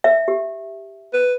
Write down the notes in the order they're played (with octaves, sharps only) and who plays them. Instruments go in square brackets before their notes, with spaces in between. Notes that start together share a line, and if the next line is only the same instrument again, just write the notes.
[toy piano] E5
G4
[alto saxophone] B4